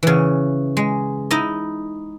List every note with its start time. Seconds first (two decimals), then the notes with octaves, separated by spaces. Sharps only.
0.03 C#3 E3
0.77 G#3
1.31 D#4 E4 D#5